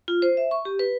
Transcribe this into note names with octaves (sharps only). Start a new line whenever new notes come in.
F4
C5
E5
C#6
G4
B4